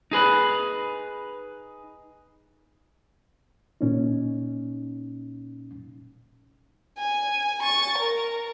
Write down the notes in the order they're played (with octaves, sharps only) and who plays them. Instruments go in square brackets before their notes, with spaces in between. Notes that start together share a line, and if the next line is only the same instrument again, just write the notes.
[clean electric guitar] D#4 G#4 B4
[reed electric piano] A#2 C#4 D#4
[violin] G#5
C#6 A6
A#4